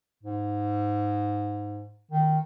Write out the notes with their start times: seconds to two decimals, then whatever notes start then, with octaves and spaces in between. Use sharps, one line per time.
0.23 G#2
2.11 D#3